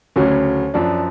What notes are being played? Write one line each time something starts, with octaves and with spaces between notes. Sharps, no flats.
D2 C#3 F#3 C#4
F#2 F3 D4